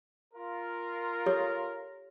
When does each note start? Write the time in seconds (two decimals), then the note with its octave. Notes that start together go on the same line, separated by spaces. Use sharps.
0.34 F4 A#4
1.26 G4 A4 C#5